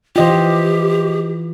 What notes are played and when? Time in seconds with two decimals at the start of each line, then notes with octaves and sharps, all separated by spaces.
0.16 E3 F4 G4 C5 D#5 G5